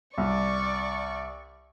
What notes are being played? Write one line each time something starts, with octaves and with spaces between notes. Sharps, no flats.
C2 D5 C#6